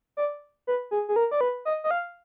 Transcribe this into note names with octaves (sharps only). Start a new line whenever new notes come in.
D5
B4
G#4
G#4
A#4
D5
B4
D#5
D#5
F5